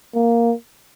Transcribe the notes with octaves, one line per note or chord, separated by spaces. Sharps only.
A#3